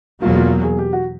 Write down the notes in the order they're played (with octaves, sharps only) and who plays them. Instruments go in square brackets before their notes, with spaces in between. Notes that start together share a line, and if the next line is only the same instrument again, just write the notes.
[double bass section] E2 B2 F#3 A#3 [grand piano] F4
[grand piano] F4
G#4
G4
F#4